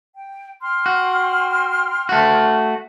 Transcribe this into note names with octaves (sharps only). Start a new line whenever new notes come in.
G5
G5 C6 F6
F#4
A3 F#4